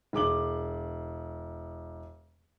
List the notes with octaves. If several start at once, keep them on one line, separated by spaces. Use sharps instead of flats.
E1 G#4 D6 F#7